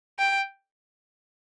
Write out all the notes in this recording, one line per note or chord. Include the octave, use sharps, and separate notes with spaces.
G5